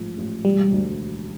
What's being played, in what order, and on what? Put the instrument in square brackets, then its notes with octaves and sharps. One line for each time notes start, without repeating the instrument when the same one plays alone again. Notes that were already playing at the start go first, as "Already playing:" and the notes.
Already playing: [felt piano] A1 G#2 F3
A1
[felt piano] E1 [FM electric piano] G3
[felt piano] D2